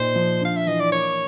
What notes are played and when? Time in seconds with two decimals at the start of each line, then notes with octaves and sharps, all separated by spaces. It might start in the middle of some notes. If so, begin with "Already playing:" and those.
Already playing: A#2 D#4 C5
0.16 F3
0.41 D4 F5
0.57 E5
0.67 E3 D#5
0.80 D5
0.92 A#3 C#5